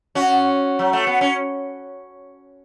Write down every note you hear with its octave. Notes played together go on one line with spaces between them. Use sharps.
C#4 F#4
F#3
A3
B3
C#4